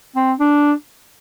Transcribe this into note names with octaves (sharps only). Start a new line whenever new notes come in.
C4
D4